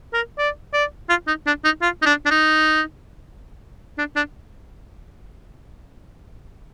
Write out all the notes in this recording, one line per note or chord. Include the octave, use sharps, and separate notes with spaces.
A#4
D5
D5
F4
D#4
D4
D#4
F4
D#4
D4
D4
D#4
D4
D4